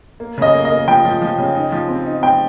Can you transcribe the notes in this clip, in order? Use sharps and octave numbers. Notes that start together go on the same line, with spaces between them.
A#3
C#3 D#5
A#3
D#5
A#3
F3 G5
F3
F3
C#3
D#4
F3
C4
D#4
C4 G5